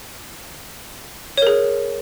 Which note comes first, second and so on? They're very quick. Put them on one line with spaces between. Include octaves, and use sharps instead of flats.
C#5 A#4 G#4